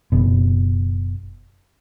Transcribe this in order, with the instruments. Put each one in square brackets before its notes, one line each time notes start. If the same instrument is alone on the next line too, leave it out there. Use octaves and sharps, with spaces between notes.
[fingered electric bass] F#1 B2